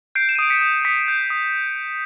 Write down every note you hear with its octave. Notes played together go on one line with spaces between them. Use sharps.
G6 C7 D7
E7
D#7
D#6 D7
B6 C#7
D#6
D#6 B6 C#7
G6
D#6